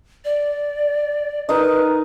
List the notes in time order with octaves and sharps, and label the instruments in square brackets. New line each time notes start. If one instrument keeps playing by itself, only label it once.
[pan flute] D5
[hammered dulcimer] D#4 A#4 D#5 [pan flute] B4